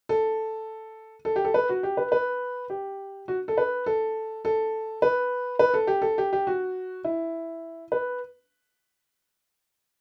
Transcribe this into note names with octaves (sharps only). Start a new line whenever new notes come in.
A4
A4
G4
A4
B4
F#4
G4
B4
B4
G4
F#4
A4
B4
A4
A4
B4
B4
A4
G4
A4
G4
G4
F#4
E4
B4